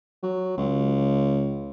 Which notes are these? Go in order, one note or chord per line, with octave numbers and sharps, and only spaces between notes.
F#3
C#2